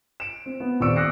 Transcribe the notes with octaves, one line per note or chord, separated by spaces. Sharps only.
D7 E7
C4
B3
D#1 C4 D5 C#6 E6 D7
D6 D#6 F#6 A#6 C7 C#7